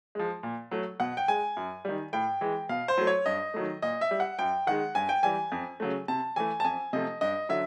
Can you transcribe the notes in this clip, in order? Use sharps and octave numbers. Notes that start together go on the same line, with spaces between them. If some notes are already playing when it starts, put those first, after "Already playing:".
F3 G#3
A#2
F#3 A3
B2 F#5
G5
G#3 G#5
F#2
D#3 G3
A2 G5
E3 G#3
B2 F5
C5
F#3 A3
C#5
G2 D#5
D#3 F#3 A3
A#2 D#5
E5
G3
F#5
F#2 G5
D#3 G#3 F#5
G2 G#5
G5
E3 G3 G#5
F2
C#3 F#3 A3
C3 A5
E3 A3 G#5
A5
F2 G#5
C3 F3 A3 D#5
G2 D#5
D3 F#3 E5